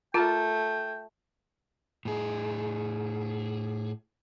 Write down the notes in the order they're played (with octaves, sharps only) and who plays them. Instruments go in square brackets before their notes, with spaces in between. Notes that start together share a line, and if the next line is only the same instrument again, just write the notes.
[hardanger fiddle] A3 [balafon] F4 [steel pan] A#4 A5 [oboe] G5
[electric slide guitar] A2 G#4